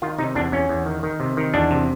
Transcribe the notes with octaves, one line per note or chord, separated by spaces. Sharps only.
D#3 F4
C3 D#4
E2 D4
E2 C#4
E2
D#3
D#3
C3
D#3
E2 D4
C3